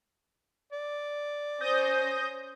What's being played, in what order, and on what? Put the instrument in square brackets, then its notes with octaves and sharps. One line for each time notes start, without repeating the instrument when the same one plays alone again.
[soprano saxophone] D5
[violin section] C#4 C5 [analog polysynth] D#6 G6 A#6